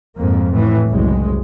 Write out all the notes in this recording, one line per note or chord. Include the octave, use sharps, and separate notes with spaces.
F2 G#2 A#3
A2 E3
F#1 C2 F#2 G#3